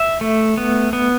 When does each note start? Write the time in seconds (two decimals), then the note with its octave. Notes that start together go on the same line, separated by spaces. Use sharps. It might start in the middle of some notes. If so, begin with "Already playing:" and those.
Already playing: E5
0.21 A3
0.58 B3
0.93 B3